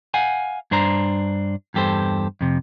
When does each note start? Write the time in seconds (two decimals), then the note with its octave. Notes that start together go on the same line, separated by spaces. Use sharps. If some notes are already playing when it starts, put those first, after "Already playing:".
0.14 F5 F#5 G#5
0.71 G2 D4 C5 A#5
1.74 E2 G2 G4 A4 C5
2.41 F2 C3